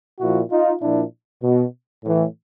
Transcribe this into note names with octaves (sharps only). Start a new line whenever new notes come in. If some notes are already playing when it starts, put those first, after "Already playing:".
A#2 F3 E4 F#4
D#4 F4
A#2 F3 D4 E4
B2
A2 E3